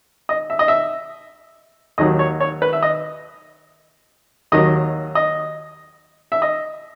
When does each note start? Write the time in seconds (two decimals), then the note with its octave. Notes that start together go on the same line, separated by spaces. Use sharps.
0.29 D#5
0.50 E5
0.59 D#5
0.68 E5
1.98 D#2 D#3 F#3 D#5
2.19 C#5
2.40 C#5
2.62 B4
2.73 E5
2.83 D#5
4.52 D#2 D#3 F#3 D#5
5.15 D#5
6.32 E5
6.42 D#5